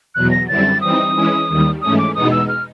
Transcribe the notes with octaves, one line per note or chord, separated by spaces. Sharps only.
E2 B2 F#3 F#6
A#6
F#2 D3 G3 C4 E4 A6
E3 G3 C4 D#4 D#6
E3 G#3 C#4 E4
D#2 D#3 G3
G#2 E3 A3 C#4 D#6
D6
E2 B2 G#3 B3 D#4 D#6
E6
F6